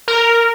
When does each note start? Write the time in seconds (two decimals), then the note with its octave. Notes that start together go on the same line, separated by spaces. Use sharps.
0.08 A#4